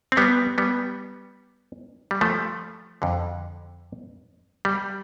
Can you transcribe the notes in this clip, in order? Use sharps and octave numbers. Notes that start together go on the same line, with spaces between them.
C4
G3 B3
G3 B3
G3
F3 A3
F2 D3
G3